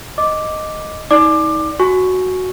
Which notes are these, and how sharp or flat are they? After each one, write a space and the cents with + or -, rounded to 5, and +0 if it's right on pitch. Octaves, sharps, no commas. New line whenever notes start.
D#5 +0 D6 +0
D#4 +30 D5 +0 D6 +20
F#4 +0 G#5 +25 C#6 +0